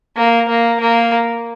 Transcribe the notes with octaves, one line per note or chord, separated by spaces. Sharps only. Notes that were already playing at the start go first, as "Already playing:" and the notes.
A#3
A#3
A#3